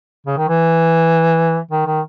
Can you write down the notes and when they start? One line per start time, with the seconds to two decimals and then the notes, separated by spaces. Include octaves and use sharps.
0.27 C#3
0.37 D#3
0.48 E3
1.71 D#3
1.86 D#3